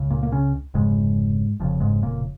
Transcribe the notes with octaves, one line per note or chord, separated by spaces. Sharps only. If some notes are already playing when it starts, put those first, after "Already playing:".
Already playing: C#2 C#3
A#2 A#3
A#3
C#3 C#4
F1 F2 G#2 C#3 G#3
F1 F2 C#3 F3
G#2 G#3
A#2 A#3